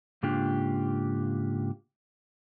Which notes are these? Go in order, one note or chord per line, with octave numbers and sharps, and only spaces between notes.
G#2 C#3 A#3 D4 F4 G4